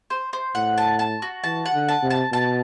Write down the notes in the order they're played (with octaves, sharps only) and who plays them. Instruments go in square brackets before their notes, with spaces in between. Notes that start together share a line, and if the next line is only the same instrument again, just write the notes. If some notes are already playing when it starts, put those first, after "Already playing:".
[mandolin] C5
C5
[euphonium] A2 [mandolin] F#5
[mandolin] A5
A5
F#4
[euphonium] E3 [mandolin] A5
[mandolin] F#5
[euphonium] D3
[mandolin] A5
[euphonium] C3
[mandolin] A5
[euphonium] B2 [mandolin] A5